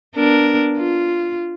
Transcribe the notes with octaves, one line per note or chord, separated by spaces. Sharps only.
B3 D4 A#4
F4